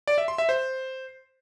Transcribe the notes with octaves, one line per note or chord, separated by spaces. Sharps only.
D5
E5
C6
E5
C5